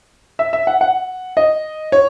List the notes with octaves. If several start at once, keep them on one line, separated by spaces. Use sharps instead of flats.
E5
E5
F#5
F#5
D#5
C#5